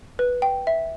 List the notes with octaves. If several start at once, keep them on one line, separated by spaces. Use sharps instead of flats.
B4
G5
E5